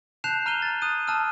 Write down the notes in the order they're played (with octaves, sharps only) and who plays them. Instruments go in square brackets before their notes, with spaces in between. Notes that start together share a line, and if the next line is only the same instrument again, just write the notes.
[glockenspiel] A5 F#6 G6 C7 E7 F7
A#5 F6 D#7 E7 G7
A6
D#6 F#6 D#7
A5 E6 F6 D#7